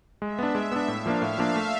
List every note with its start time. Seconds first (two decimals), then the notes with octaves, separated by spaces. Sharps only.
0.21 G#3 E5
0.39 B3 D4
0.55 G#3
0.72 B3 D4
0.88 A2 F5
1.06 F3 A#3 D4
1.22 A2 E5
1.38 F3 A#3 D4
1.56 A3